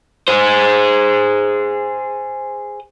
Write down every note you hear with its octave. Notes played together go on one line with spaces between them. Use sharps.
G#4 C5